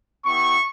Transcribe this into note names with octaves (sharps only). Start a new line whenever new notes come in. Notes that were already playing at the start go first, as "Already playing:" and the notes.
B3 E4 G4 C#6